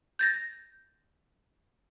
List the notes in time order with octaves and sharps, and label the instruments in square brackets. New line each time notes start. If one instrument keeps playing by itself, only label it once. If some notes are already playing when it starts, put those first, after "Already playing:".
[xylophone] G6 A6 A#6